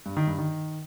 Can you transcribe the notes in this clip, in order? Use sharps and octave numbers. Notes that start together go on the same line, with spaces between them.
G2
D#3
G2
D#3